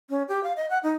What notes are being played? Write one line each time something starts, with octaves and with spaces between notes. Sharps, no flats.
C#4
G4
F5
D#5
F#5
D#4